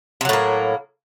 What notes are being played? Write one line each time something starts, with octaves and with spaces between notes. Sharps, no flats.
A2 C3 F#3 A#3